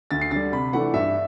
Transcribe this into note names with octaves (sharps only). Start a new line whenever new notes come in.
D2 A6
C7
D3 G3 A6
C3 B5
E3 A3 D4 F#5
G2 E5